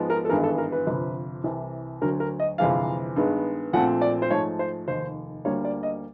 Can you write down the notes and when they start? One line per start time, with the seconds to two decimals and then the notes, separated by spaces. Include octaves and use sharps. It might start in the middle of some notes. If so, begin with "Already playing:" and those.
Already playing: G#2 F3 G#3 B3
0.10 A#4
0.25 A4
0.29 G#1 G2 E3 G#3 B3 A#4
0.43 A4
0.58 A#4
0.72 B4
0.87 G1 F2 C3
1.44 C2 C3 E3
2.01 D2 D3 F#3 A#4
2.20 A#4
2.40 D#5
2.58 G1 F2 C3 E3 G#3 F5
3.16 G2 D#3 G#3 B3
3.73 A#1 A#2 F3 A3 C4 F#5
4.01 D5
4.22 C5
4.30 G#2 F3 A3 C#5
4.59 C5
4.88 F1 D#2 D#3 C5
5.45 D2 D3 G3 A#3 C#5
5.65 D5
5.83 D#5